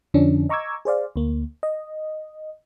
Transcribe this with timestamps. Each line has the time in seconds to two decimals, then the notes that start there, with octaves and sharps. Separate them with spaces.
0.14 F2 D3 F3 C#4 D4
0.49 D#5 A#5 C#6 D6 E6 G#6
0.85 G#4 C5 D5 F5
1.16 D2 A#3
1.63 D#5